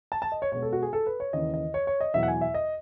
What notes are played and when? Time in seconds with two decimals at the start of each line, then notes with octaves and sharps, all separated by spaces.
0.12 A5
0.22 A5
0.32 D#5
0.42 C#5
0.52 B2 G#3 B3 C#5
0.62 A4
0.73 F#4
0.82 G#4
0.93 A4
1.06 B4
1.20 C#5
1.33 D#2 C#3 E3 D#5
1.54 D#5
1.74 C#5
1.87 C#5
2.01 D#5
2.14 E2 B2 F#3 E5
2.23 F#5
2.28 G#5
2.41 E5
2.54 D#5